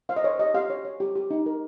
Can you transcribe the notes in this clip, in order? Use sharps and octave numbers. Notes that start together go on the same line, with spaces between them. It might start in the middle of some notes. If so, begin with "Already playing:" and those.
C5 F5
D#5
C5 C#5
G4 D#5
G4 F5
C#5
C#5
G4
G4
D#4
A#4